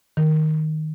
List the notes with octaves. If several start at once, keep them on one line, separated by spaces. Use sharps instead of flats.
D#3